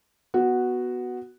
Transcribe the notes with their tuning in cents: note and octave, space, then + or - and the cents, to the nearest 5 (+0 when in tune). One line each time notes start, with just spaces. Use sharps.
B3 +0 F#4 +0